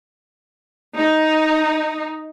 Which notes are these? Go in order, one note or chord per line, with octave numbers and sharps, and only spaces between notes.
D#4